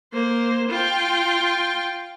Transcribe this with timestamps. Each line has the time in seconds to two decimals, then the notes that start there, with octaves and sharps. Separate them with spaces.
0.13 A#3 C5
0.69 F4 G5